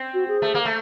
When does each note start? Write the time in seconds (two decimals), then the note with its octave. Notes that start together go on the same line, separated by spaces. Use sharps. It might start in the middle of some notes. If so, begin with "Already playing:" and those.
Already playing: C4
0.14 F#4
0.28 G#4
0.42 A3
0.54 A#3
0.65 A3